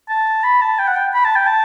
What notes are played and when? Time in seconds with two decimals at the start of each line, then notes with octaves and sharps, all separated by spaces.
0.09 A5
0.44 B5
0.62 A5
0.79 G5
0.88 F#5
0.96 G5
1.14 B5
1.25 A5
1.36 G5
1.47 A5